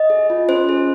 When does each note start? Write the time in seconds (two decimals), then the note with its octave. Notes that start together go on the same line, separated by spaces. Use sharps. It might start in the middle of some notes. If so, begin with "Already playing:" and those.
Already playing: D#5
0.10 G#4
0.30 F4
0.48 C#4 C5
0.69 G#4